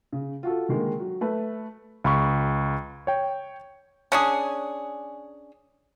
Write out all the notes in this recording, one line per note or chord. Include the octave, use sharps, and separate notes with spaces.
C#3
F4 F#4 A4
D3 D#3 G#3 A#3
F#3
A3 B4
C#2 B5 C#6
C#5 G5
C#4 D4 G#4